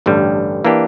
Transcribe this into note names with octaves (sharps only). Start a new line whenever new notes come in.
A1 G2 D3 G3
E3 A#3 D4 G4